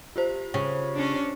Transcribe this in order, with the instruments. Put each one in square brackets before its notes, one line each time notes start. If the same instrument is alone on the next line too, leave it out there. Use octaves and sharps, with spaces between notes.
[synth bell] F4 G4 C5
[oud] C#3
[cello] C#4 D4